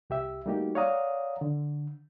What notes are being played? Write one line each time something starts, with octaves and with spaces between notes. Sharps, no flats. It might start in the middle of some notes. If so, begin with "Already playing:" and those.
C2 G4 E5
G3 A3 A#3 D#4 F#4 G4
C#5 D5 F5 F#5 A#5 D#6
D3